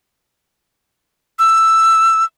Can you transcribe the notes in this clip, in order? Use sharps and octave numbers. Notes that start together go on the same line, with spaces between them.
E6